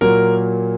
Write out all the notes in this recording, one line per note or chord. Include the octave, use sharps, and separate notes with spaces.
A#2 F#3 A#3 A#4